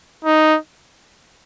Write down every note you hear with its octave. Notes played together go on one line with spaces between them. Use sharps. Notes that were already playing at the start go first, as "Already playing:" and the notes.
D#4